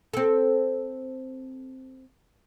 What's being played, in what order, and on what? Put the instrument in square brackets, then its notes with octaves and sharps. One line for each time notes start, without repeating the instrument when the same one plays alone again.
[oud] C4 A4